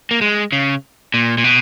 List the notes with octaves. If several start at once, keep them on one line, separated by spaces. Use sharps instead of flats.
A#3
G#3
C#3
A#2
A#2
B2